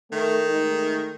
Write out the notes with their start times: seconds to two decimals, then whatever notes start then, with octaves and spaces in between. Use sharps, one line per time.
0.12 D#3 A3
0.47 G#3 A3 D#4